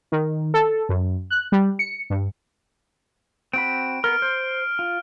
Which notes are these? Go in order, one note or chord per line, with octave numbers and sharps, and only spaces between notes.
D#3
A4
F#2
F#6
G3
C#7
G2
C4 F#4 B5 D7
B3 A#4 F6
C5
F4